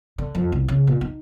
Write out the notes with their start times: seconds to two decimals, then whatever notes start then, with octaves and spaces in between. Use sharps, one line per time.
0.18 D3
0.35 F2
0.52 C2
0.68 C#3
0.87 A#2
1.01 D#4